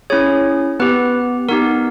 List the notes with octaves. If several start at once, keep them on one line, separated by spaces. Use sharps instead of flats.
C#4 E4 G#4 C#5
B3 G4 B4
B3 D#4 G4 A#4